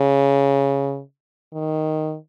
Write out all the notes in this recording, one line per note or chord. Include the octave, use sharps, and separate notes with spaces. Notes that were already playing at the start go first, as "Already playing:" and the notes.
Already playing: C#3
D#3